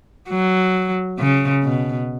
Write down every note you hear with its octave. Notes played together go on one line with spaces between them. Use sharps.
F#3
C#3
B2